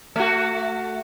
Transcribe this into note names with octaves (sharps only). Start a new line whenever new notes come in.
A3 F#4